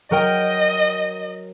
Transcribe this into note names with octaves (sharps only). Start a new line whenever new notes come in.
F#3 A#4 D#5 G5